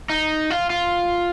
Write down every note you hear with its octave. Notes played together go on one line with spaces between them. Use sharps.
D#4
F4
F4